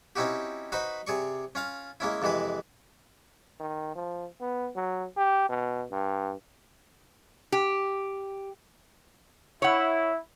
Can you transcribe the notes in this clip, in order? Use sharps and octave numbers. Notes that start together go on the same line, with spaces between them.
C4 C#4 D#4 E4 F#4 G4
D#4 F#4 B4 C5 B5
C3 G#4 D5 C#6
C#4 F4 F5
G#3 A#3 C#4 E4
F2 C3 E3 G#3 B4
D#3
F3
B3
F#3
G4
B2
G2
G4
E4 C#5 F#5